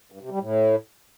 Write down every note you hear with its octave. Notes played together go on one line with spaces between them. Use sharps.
G2
C3
G3
A2